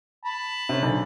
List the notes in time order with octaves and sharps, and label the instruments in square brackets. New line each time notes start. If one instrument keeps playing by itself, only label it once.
[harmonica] A5 B5
[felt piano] C3 C#4
B1 D3